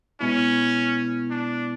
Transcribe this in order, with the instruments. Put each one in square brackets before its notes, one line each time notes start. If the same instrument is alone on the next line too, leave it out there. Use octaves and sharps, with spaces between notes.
[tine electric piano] B2 G#3 B3 E4 [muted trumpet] C#4
[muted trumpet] D4